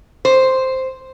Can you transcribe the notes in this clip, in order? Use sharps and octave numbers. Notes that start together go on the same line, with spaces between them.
C5